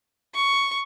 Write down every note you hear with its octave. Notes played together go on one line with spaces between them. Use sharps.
C#6